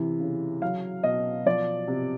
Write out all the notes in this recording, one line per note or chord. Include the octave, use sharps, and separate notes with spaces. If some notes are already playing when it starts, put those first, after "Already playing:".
Already playing: C3 E3
C#3
F#3 F5
B2 D#5
F3 D5
C3